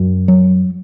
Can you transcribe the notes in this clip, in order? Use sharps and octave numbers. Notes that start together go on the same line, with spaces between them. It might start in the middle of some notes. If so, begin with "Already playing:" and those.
Already playing: F#2
F#3